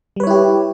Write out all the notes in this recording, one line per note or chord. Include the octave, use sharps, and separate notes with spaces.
G3 E4 G4 B4 C#5